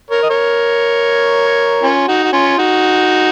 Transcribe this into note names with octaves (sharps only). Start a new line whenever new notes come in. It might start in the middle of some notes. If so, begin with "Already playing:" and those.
A#4 C#5
D#5
A#4 C#5
C#4 F4
D#4 F#4
F#4
C#4 F4
D#4 F#4